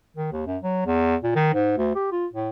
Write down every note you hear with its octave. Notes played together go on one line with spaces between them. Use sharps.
D#3
D#2
F#2
F#3
E2
A#2
D#3
G#2
D2
G4
F4
A2